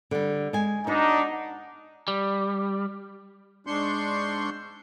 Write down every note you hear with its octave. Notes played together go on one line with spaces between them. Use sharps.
D3 G3
G#3 G#5
B3 D4 D#4 F#4
G3
G#2 D4 C6 C#6 G6